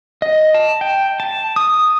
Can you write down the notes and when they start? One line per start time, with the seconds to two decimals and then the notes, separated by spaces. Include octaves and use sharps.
0.22 D#5
0.54 A5
0.81 G5
1.20 A5
1.56 D#6